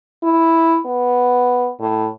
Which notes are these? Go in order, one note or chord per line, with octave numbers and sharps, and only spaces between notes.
E4
B3
A2